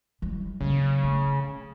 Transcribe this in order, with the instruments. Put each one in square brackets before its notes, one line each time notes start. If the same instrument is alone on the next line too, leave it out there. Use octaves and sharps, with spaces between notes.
[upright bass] E3 G3
[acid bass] C#3 [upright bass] F#3 A#3
[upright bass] A3